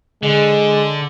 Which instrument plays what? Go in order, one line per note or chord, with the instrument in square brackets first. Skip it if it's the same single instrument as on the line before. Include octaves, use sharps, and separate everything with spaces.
[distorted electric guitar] D3 [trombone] G#3